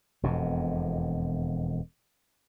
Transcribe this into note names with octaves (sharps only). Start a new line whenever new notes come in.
E1 F2 B2